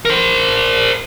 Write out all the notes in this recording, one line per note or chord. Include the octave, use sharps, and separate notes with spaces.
A#4 C5